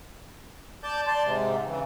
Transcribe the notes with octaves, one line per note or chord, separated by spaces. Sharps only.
D5 A5 G6
D5 A5 C6
G#2 C3
C#3 E3